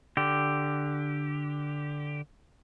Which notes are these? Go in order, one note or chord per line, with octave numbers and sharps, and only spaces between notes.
D3 G4